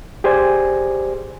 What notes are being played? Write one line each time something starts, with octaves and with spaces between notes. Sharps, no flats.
G4 G#4 C5 D5 G#5